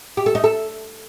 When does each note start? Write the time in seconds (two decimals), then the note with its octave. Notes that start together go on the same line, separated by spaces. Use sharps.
0.17 G4
0.26 A4
0.35 D#4
0.44 A4